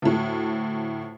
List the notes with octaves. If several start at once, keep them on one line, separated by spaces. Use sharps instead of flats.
D2 A2